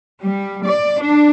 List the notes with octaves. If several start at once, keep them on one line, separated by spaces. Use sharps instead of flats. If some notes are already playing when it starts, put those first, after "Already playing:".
G3
D5
D4